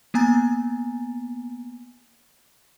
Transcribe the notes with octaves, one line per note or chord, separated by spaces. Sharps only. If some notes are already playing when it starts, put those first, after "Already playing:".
A#3 B3 G#5 A#5 A6